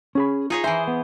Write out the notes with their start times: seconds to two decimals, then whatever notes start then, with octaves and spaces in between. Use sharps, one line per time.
0.15 C#4 G#4 B5
0.50 D#4 F4 G#4 C#5
0.64 E3 C5 E5 G#5
0.88 B3